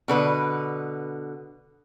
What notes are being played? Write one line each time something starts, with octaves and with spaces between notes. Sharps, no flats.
B2 D3 B4